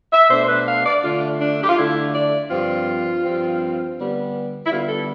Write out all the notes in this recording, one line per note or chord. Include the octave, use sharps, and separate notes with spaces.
E5
B2 A3 D4 C5
C5
B4
F5
D5
D3 A3 D4 F4
D4
G4
F4
D3 A3 D4 E4
D5
G2 F3 C4 F4
G2 F3 C4
D3 G3 B3
E4
D3 G3 B3 F4
A4